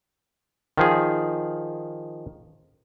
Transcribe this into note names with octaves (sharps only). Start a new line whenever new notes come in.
D#3 F3 G#4